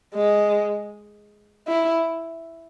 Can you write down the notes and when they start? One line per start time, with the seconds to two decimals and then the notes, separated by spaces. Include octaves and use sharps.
0.15 G#3
1.67 E4